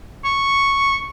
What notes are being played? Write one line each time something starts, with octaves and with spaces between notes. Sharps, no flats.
C#6